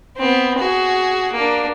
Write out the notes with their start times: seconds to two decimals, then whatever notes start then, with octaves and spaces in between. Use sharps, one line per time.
0.17 B3 C4
0.58 F#4 G#4
1.33 A#3 D4